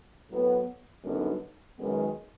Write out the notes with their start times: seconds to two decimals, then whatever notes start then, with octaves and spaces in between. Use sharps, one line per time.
0.30 A2 F#3 B3
1.04 F#2 D3 G3 B3 D#4
1.78 F#2 D#3 G#3 B3